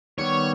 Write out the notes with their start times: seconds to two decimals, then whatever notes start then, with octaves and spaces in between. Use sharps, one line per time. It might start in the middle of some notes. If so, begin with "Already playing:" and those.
0.18 D#3 G3 B3 C#5